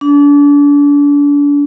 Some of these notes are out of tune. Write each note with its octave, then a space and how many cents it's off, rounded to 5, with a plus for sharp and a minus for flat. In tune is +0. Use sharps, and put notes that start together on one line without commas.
D4 -35